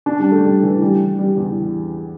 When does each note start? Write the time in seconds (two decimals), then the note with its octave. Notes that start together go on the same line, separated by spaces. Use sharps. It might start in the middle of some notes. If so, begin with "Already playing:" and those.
0.06 D4
0.20 G3
0.31 A3
0.44 G3
0.63 E3
0.81 G3
1.19 G3
1.37 E2